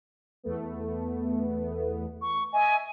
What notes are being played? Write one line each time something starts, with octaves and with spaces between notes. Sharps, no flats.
E2 A3 B3
C#6
D#5 E5 G#5